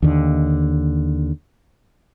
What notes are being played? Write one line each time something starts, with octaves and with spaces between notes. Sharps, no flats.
D#2 D3